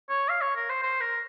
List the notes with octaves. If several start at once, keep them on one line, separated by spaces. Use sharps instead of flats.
C#5
F5
C#5
A#4
C5
C5
A#4